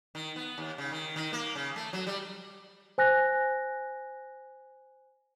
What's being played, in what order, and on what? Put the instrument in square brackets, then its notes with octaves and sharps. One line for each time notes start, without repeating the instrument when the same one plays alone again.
[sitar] D#3
B3
D#2
C#3
D#3
D#3
A#3
C#3
A3
F#3
G3
[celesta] C5 G#5 F#6 A#6